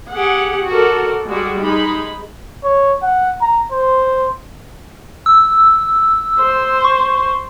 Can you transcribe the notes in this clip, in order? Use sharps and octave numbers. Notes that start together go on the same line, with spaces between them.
G4 G#4 F#5
F#4 A4 A#4 D5
G3 G#3 F#4
G#3 D#4 B5
C#5
F#5
A#5
C5
E6
C5
C#6